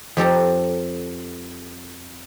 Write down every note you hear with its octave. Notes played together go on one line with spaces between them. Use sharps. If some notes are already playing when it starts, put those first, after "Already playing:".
F2 G4 A4 A#5